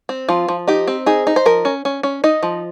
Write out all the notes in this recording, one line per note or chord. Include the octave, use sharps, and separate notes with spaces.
C4
F3 F4
F3
D#4 G4
C4
D#4 G#4
D#4
C5
F3 A#4
C#4
C#4
C#4
D#4 D#5
F3